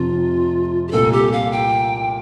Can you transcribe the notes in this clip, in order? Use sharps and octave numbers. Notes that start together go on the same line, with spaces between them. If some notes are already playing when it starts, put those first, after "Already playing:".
Already playing: F1 F2 C3 F4
G4
C2 A#2 A3 A4
G4
F5
G5